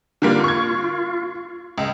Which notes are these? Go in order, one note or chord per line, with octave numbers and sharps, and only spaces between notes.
D3 G3 A#3 F4
C#6 G#6
C#2 G#3